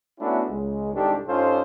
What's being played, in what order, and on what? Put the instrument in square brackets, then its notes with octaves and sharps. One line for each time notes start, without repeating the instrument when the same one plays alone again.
[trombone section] A3 B3 C#4 D4 E4 F#4
C#2 G#3
C2 G#2 D#3 D4 G4 A4
G2 C#4 D#4 F4 A4 C5